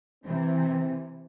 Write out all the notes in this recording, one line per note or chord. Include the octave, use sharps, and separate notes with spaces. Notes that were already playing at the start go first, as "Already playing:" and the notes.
C3 E3 C4